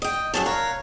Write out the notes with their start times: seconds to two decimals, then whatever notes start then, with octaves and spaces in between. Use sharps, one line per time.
0.02 D#5 G5
0.34 F#2 A3 G#4 C#5 A5
0.46 A#4 C#5 F5 F#6